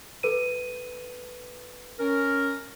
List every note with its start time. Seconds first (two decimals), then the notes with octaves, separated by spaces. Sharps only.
0.23 A4 B4 D#7
1.99 C#4 A#4